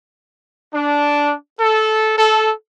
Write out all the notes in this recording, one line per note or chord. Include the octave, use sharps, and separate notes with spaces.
D4
A4
A4